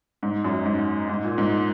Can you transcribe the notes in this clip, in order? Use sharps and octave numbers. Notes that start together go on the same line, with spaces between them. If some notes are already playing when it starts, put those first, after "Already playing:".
G#2
F#2
G#2
G#2
A#2
G#2